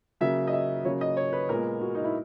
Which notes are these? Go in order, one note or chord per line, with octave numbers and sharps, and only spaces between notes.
C#3 F#3 A#3 E5
D#5
E5
C#3 F#3 A#3 C#5
D#5
C#5
B4
A#2 G#3 B3 A#4
F#4
D#4
E4